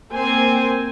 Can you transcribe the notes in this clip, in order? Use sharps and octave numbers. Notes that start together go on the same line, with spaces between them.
A#3 C4 C5 G#5